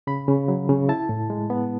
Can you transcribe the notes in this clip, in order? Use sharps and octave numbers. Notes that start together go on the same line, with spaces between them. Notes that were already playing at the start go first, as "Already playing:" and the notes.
C#3 B5
C#3
F#3
C#3
E4 A5
A2
G#3
B3